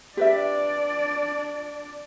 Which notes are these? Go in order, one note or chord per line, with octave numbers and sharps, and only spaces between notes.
D4 G4 B4 D5 E5